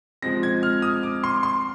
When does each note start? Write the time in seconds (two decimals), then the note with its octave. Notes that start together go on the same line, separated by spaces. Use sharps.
0.22 F3 G#3 C4 A#6
0.43 G#6
0.63 F6
0.82 D#6
1.03 D6
1.24 C6
1.43 C6